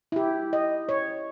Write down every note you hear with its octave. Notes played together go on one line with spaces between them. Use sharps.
E4 G4
D#5
C#5